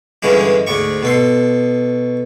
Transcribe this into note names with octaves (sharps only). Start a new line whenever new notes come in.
G2 D3 E3 G#3 C#4 D4
D2 G#2 D5 C#6
B2 A4 C6